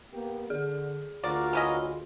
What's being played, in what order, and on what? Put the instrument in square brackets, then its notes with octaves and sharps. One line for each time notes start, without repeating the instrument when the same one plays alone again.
[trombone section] A#3 B3 G4
[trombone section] D3 [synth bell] G#4
[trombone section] D2 F4 [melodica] F#4 A#4 F5 [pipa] D5
[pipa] E3 C#4 D#5